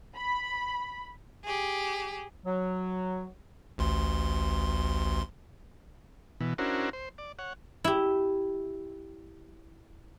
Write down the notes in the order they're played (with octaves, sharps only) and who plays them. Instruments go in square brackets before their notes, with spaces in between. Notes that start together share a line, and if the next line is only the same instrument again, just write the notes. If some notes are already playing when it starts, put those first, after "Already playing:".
[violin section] B5
[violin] G4 G#4
[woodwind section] F#3
[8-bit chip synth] A1 D2 C6
[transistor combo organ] B2 E3
C#4 D4 E4 F#4 A#4 C5
C5
D5
C#5 F#5
[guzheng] E4 G4